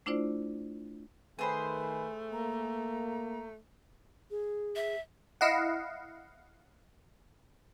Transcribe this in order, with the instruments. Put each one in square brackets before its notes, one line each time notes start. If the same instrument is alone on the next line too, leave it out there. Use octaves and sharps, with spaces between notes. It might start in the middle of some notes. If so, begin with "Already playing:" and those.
[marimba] A3 D4 E4 F4 C5 D5
[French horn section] D#3 [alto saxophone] A3 [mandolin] G#4 C5 B5 [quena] B4
[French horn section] A#3 [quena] A#5
[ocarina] G#4
[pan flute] E5
[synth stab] E4 D#5 F5 F#5